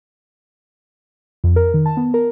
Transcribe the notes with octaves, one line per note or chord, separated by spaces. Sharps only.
F2
A#4
D#3
A5
B3
A#4